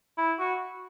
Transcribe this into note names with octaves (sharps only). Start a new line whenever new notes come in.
E4
F#4